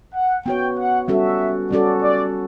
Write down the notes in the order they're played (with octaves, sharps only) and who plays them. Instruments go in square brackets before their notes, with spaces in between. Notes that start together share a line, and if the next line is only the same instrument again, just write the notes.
[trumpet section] F#5
[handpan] B3 F#4 C#5 [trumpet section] G5
[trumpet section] F#5
[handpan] G3 C#4 F#4 A4 [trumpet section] E5
[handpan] G3 C#4 F#4 A4 [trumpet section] D5
[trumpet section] D5